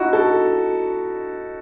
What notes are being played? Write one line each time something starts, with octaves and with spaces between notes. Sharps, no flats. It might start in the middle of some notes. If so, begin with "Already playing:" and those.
Already playing: D#4 E4 F#4
A4